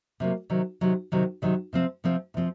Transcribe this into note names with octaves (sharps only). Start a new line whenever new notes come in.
C3 F#3 A#3
C3 D#3 F#3
C3 D#3 F#3
C3 D#3 F#3
C3 D#3 F#3
C3 F3 C4
C3 F3 C4
C3 F3 C4